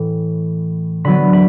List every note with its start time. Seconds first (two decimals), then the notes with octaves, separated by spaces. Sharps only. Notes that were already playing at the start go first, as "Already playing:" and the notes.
Already playing: A2 E3
1.04 D3 F#3 B3 B5
1.33 B5